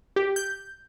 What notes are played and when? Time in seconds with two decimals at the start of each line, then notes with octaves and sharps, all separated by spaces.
0.16 G4
0.36 G6